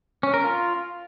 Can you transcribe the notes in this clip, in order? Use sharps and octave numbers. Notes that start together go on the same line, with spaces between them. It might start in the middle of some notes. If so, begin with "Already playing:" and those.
C#4
A#4
F4